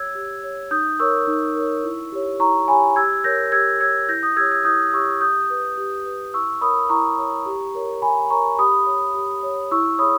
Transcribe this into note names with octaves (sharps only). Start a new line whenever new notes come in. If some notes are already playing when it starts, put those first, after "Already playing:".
Already playing: G4 C#5 E6 G#6
G4
C#5
D#4 D#6 G6
A#4 C#5 C#6 E6
D#4
A#4 C#5
E4
G4 C#5
E4 A#5 C#6
G4 C#5 G#5 B5
G4 E6 G#6
A#4 C#5 G6 A#6
G4 E6 G#6
A#4 C#5 E6 G#6
E4 G6 A#6
D#6 G6
G4 C#5 E6 G#6
E6 G#6
E4 D#6 G6
G4 C#5 C#6 E6
G4 D#6 G6
B4
G4
B4
E4 C#6 E6
A#4 C#5 B5 D#6
E4 A#5 C#6
A#4 C#5
G4
A#4 C#5
G4 G#5 B5
A#4 C#5 A#5 C#6
G4 B5 D#6
C#5
G4
C#5
E4 C#6 E6
G#4 C#5 B5 D#6